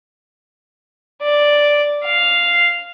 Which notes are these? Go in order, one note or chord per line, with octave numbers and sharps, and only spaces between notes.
D5
F5